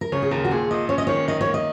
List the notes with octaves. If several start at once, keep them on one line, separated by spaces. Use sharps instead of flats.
A#4
C#3 C#5
G#4
D#2 A#4
F#4
A#2 G#4
A#2 D#5
C#4 C#5
D#5
D#3 C#5
D#3 D#5
C#5
A#3
D#5